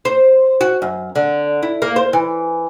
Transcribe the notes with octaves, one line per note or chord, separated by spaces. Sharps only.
C5
F#4
F#2
D3
E4
A#3
C5
E3